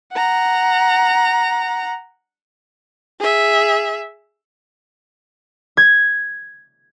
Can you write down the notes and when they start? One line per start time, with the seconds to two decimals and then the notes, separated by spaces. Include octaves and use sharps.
0.13 F#5 A#5
3.20 G#4 E5
5.77 G#6